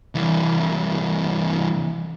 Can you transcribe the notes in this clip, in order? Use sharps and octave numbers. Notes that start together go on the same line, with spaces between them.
C2 E3